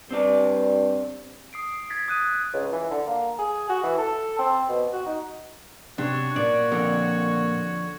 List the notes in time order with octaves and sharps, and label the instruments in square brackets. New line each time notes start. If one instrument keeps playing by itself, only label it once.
[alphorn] G2 [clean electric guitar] C4 D5
[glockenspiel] D#6 C7 D7
G#6 A6 B6
D#6 F#6 D#7
[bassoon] C#2
E3
D3
A#3
G#4
F#4
E3
A4
C4
B2
F#4
D#4
[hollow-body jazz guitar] C3 [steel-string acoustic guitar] D4 [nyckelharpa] F#4 C#5
[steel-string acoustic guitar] A#2 [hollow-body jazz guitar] D5
[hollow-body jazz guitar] F2 D3 A#4